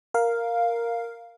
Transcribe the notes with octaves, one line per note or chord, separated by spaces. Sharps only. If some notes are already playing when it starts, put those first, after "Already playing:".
A#4 F5